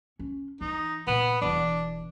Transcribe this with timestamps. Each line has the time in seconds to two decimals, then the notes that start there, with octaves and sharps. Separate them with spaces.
0.19 C#4
0.61 E3 D#4
1.07 A#2 B3
1.41 E1 E3 D4